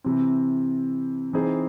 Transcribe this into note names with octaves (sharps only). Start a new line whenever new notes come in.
C3 E3 C4
E3 C4 D#4 G#4 C5